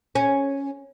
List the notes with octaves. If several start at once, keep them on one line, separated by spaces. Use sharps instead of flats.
C#4